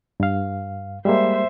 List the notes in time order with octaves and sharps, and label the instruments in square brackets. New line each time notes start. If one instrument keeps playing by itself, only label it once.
[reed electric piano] G2 F5
[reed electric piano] G3 G#3 A#3 [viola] C5 E5